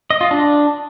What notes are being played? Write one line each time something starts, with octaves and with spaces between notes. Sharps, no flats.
D#5
F4
D4